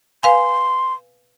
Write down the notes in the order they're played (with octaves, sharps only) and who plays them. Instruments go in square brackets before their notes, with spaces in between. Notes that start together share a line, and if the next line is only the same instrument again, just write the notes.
[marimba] B4 F5 G#5 [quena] C6